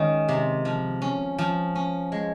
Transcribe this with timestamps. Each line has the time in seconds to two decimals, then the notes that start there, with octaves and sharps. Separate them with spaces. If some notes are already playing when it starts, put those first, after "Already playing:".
Already playing: D#3 G#3 C#4
0.29 C3
0.65 F3
1.02 C#4
1.38 F3
1.75 C#4
2.12 G#3